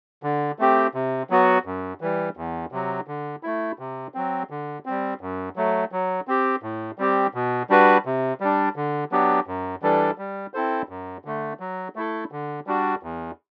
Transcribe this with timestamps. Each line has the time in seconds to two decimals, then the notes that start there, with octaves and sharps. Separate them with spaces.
0.23 D3
0.59 A3 C4 G4
0.94 C3
1.30 F#3 B3 F#4
1.65 F#2
2.01 E3 G3
2.37 E2
2.72 C3 F#3
3.07 D3
3.43 A3 E4
3.79 C3
4.14 F#3 C4
4.50 D3
4.86 G3 C4
5.21 F#2
5.56 F#3 A3
5.92 F#3
6.28 C4 G4
6.63 A2
6.98 G3 C4 G4
7.34 B2
7.70 G3 D4 F#4 B4
8.05 C3
8.40 G3 D4
8.76 D3
9.12 F#3 B3 D4 G4
9.47 F#2
9.82 E3 G3 D4 A4
10.18 G3
10.54 C4 E4 A4 C5
10.89 F#2
11.25 D3 A3
11.60 F#3
11.96 A3 E4 A4
12.32 D3
12.67 G3 D4 F#4
13.03 E2